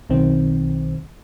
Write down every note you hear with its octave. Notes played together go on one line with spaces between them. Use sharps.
B1 D#3 C4